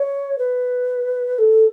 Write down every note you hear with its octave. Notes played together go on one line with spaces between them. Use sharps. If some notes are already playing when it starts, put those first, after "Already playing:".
Already playing: C#5
B4
A4